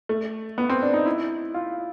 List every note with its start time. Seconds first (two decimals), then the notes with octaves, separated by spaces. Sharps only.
0.09 A3
0.58 B3
0.70 C4
0.82 D4
0.94 D#4
1.06 E4
1.54 F4